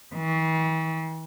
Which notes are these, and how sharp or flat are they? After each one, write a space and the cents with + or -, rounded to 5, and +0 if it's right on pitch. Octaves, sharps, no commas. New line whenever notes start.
E3 -45